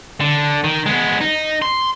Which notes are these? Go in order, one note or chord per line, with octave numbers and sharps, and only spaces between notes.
D3
D#3
G#3 B3
D#4
C6